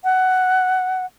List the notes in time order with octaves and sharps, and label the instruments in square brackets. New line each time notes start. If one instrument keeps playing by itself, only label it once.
[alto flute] F#5